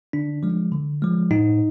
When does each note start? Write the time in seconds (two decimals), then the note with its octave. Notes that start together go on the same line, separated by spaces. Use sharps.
0.13 D3 D4
0.43 F3 G#3
0.72 D3
1.02 F3 G#3
1.31 A2 D#4